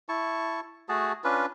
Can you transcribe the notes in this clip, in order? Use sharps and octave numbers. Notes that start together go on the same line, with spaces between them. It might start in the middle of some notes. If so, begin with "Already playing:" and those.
E4 A5 C#6
A3 F#4 G#4 A5
C#4 D4 F4 B4